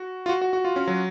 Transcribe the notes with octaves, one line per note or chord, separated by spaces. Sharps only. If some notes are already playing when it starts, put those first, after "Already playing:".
Already playing: F#4
F4
F#4
F#4
F#4
F4
C#4
F#3